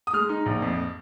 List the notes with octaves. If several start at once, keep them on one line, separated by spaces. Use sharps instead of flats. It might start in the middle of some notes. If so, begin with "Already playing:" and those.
D#6
G#3 F6
D#4
A#1
F2